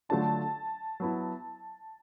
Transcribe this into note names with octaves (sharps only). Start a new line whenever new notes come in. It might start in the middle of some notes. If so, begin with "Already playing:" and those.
D3 F#3 A3 D4 F4 A5
F#3 B3 E4